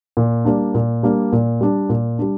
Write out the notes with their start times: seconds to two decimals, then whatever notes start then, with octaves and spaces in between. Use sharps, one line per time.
0.17 A#2
0.45 G3 A#3 D4
0.74 A#2
1.03 G3 A#3 D4
1.32 A#2
1.61 G3 D4
1.89 A#2
2.19 G3 D4